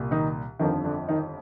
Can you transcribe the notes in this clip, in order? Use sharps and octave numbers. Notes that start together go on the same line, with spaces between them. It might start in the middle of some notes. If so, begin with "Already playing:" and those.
Already playing: C2 A#2
D#3 D#4
G1 F2 D3 D#3 F3 D#4
D3 D4
D#3 D#4